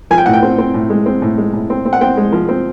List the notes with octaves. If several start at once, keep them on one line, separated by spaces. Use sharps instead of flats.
F3 G#5
G5
A2 F#5
G5
C4
C4
A2
G#3
C4
A2
G#3
A2
C4
C4
F#5
C4 G5
G#3
F3
C4